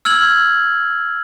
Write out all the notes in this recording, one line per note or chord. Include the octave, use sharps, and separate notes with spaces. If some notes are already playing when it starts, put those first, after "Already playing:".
E6 F6 G#6 F#7